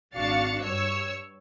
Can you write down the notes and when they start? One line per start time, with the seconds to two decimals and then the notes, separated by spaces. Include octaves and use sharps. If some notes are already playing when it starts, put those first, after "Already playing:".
0.14 G#1 D4 F#4 F5 A6 C#7
0.62 G2 C#5 E6 C#7